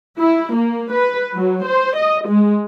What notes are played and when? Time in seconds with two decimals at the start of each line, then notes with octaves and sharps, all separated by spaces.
0.18 E4
0.53 A#3
0.93 B4
1.35 F#3
1.66 C5
1.97 D#5
2.28 G#3